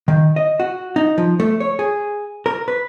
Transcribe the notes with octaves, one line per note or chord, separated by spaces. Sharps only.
D#3
D#5
F#4
D#4
F3
A3
C#5
G#4
A#4
B4